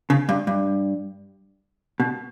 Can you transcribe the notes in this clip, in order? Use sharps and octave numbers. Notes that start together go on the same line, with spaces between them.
C#3
G2
G2
B2